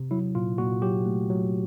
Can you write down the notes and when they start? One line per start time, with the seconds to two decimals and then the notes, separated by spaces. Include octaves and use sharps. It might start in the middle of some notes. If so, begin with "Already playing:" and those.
Already playing: C3
0.11 F#3 E4
0.35 A#2 F4
0.58 A#2 F#4
0.82 F#3 G4
1.06 A3
1.30 F#3